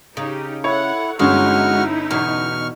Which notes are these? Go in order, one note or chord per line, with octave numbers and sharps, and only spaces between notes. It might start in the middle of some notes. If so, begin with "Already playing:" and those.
C#3 D#4 G4
E4 A4 C#5 F#5
G1 G#3 C#4 D#4 E4 F#4 C#6 F6
E2 B2 C#6 F6